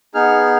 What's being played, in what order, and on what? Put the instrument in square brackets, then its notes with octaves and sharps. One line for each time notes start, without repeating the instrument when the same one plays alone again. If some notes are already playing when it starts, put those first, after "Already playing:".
[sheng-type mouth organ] B3 D#4 G#4 F6